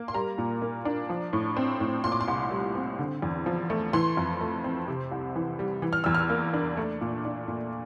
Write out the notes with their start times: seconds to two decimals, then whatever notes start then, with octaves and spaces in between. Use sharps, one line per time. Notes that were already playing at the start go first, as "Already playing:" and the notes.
Already playing: A#3
0.08 C6
0.14 G3 A#5
0.38 A#2
0.62 A#3
0.85 D4
1.09 F3
1.33 A2
1.57 C4
1.80 A2
2.04 A#2 C6
2.12 D6
2.21 C6
2.28 C2
2.51 G3
2.75 C4
2.99 D3
3.22 E2
3.46 F3
3.70 A3
3.93 E3 C6
4.17 F2
4.41 A3
4.64 C4
4.88 C3
5.12 C2
5.35 E3
5.59 G3
5.82 E3
5.93 F6
6.04 E2 E6
6.15 F6
6.30 A#3
6.54 D4
6.77 A3
7.01 A#2
7.25 D4
7.48 A#2